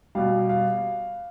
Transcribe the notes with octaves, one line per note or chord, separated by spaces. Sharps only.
B2 G3 F5
F5